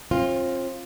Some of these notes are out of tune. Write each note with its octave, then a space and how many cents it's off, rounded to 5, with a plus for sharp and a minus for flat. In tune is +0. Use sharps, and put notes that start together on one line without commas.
C4 +40 F4 +0